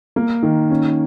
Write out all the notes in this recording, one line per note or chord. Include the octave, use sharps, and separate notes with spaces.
A#3
D#3
C#4